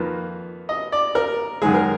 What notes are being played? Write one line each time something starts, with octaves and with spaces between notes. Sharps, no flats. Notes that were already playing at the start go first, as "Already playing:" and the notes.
Already playing: F2 D#3 A#3 F4 B4
D#5
D5
A#4
F#2 D#3 G#3 G#4
A#4